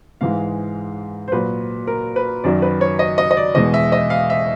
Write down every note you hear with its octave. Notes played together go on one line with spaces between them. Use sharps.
G#2 E3 G#3 F5
C5
A#2 F#3 B4
A#4
B4
F#2 D#3 F#3 D5
B4
C#5
D#5
D#5
D#5
D5
E2 B2 G#3 D#5
E5
D#5
F5
E5